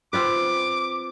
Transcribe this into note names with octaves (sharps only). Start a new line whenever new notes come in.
C4 F4 B4 D6